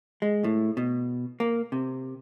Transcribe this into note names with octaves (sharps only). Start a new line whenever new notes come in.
G#3
A2
B2
A#3
C3